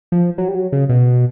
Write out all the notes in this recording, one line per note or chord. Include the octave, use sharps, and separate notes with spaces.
F3
F#3
G3
F#3
C#3
B2